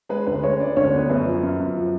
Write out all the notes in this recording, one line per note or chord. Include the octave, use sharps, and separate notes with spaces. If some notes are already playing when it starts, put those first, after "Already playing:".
G#3 B4
D2 B4
G#3 C#5
D3 D5
D2 C#5
B3
F#2 B4
F3
F#2
F#2
F3